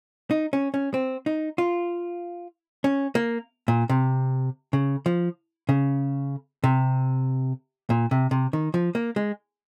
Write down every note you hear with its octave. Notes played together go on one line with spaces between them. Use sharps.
D#4
C#4
C#4
C4
D#4
F4
C#4
A#3
A#2
C3
C#3
F3
C#3
C3
A#2
C3
C3
D#3
F3
A#3
G#3